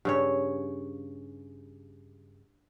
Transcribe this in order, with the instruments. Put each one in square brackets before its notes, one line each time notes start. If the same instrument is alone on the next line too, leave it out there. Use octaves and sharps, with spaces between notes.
[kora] G2 C#3 C#5